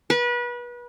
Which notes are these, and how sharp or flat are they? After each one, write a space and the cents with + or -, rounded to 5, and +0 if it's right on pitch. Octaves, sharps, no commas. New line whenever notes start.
B4 -30